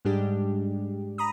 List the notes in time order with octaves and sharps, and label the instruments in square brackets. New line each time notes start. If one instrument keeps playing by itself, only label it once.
[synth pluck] G#2 G3 G#3 D4 G4
A#5 B5 D#6